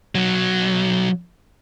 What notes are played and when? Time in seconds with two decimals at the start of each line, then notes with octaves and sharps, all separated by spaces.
0.15 B1 F#3